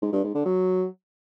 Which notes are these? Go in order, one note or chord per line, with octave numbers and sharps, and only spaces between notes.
G#2
G2
G#2
D3
F#3